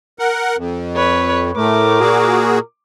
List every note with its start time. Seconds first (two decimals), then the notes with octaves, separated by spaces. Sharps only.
0.19 A#4 F#5
0.57 F2
0.95 B4 C#5
1.57 A2 A3 A#4 D6
2.00 A#2 F#4 G#4